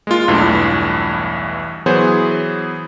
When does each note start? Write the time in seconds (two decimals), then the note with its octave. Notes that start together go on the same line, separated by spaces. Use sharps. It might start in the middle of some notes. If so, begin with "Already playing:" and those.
0.07 G#3 A#3 F4
0.28 B1 E2 G2 E3 A3
1.86 E3 F#3 B3 G#4 C5 C#5